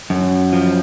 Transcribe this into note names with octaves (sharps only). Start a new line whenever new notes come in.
F#2
F3